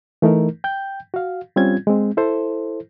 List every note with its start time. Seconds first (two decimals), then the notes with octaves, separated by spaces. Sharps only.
0.22 E3 A3 D#4 A#4
0.64 G5 G6
1.14 F#4 F5
1.56 G3 C4 C#4 F4 G#6
1.87 G#3 C4
2.17 E4 A4 C5